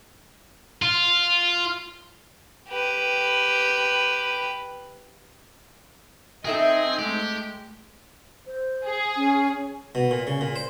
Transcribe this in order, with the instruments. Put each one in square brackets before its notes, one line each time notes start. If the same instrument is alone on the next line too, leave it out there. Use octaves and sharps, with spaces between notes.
[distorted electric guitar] F4
[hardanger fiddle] G4 B4
[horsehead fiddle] C4 D#4 [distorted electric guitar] G#4 [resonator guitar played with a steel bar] A4 E5 G5 [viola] D#5
[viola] G#3 A3 [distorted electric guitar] G4
[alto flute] C5
[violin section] G#4
[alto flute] C#4
[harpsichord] B2
A#2
C#3
A#2
C5